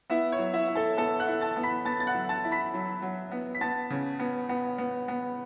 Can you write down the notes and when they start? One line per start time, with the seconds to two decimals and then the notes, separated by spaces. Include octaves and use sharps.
0.10 B3 E4 E5
0.32 C#5
0.39 F#3
0.53 E4 E5
0.68 E4
0.76 A4 A5
0.97 B3 A4 A5
1.20 F#5 F#6
1.27 E4
1.41 A5 A6
1.56 B3
1.63 B5 B6
1.85 B3 A5 A6
2.00 A6
2.07 F#5 F#6
2.14 F#3
2.29 A5 A6
2.44 E4
2.51 B5 B6
2.74 F#3
3.02 F#3
3.32 B3
3.55 B6
3.61 B3 A5 A6
3.90 C#3
4.19 B3
4.49 B3
4.78 B3
5.08 B3